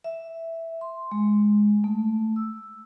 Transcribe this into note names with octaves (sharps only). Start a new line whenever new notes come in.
E5
C6
G#3
A3
E6